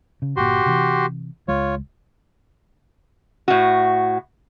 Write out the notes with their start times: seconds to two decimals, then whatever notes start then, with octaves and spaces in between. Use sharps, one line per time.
0.22 C#3
0.36 G1 A#2 F#4 G4 C6
0.66 C3 E3
1.48 C#2 G#3 F4 C#5
3.48 A2 F#4